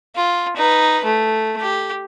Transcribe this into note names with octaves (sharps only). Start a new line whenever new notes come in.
F4
D#4 B4
A3
G4